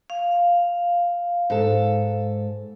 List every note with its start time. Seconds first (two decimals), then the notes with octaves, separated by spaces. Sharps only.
0.10 F5
1.50 G#2 A4